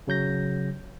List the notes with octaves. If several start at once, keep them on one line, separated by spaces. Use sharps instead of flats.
C#3 F#3 G6 A#6